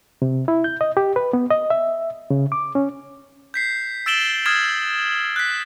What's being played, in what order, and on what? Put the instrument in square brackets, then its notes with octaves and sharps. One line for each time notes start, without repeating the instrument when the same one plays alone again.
[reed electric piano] C3
E4
G6
D#5
G4
B4
B3
D#5
E5
C#3
D6
C#4
[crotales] G6 B6 C7
E6 A6 D7 E7 F#7 G7
D#6 F6 G#6 A6 C7 E7
F#6 B6